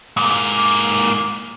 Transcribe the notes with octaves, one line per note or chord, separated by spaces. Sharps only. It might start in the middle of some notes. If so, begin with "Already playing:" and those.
G#2 A#3